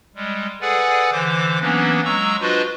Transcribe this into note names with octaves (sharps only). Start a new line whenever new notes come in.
G3 G#3
G#4 A4 B4 D5 F#5 G#5
D3 E3 C5 D6
E3 F#3 A#3 B3 C#4 D4
F#3 G#3 A#5 C#6 E6
D4 F4 F#4 B4 C5 D#5